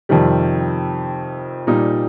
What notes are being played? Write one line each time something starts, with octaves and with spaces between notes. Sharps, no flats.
F2 C3 D#3 G3
A#2 G3 A#3 D#4